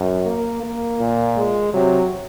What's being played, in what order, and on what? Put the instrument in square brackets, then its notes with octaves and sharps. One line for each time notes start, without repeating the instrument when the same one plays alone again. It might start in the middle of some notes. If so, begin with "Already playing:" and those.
Already playing: [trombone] F#2
[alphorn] A#3
A#3
[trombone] A#2
[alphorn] G#3
[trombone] C3 [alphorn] F#3